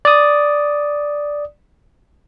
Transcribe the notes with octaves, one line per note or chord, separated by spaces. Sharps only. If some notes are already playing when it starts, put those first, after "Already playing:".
D5 D#6